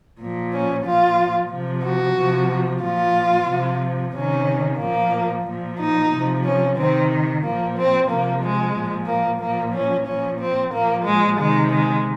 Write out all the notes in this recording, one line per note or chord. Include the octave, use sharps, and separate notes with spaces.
A#2 F3
C#4
A#2 F3 F4
C3 F3
F#4
C3 F3
A#2 F3 F4
C3 F3
C3 D#3 C#4
A#2 F3 A#3
A#2 F3
D#4
C3 F3
C#4
C3 D#3 C4
A#2 F3 A#3
C4
C3 F3 A#3
G#3
A#2 F3
A#3
A#2 F3 A#3
C#4
A#2 F3 C#4
C4
A#2 F3 A#3
G#3
C3 D#3 G#3
G#3